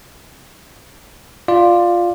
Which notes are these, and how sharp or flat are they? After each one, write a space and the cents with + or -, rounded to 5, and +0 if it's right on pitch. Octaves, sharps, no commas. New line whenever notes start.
F4 +0 D5 +10